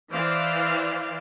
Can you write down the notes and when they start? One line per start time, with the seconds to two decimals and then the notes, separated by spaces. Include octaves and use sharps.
0.12 E3 C5 D5 F5